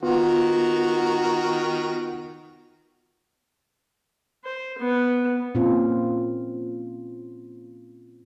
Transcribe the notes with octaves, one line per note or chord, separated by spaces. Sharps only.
D#3 B3 F4 F#4 A#4
C5
B3
A#2 C4 C#4 F4